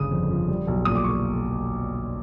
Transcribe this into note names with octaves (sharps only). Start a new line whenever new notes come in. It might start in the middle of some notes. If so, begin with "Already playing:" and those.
Already playing: G1 C#3 D#6
F2
F3
G3
B1
A#2 D#6
D6
C#6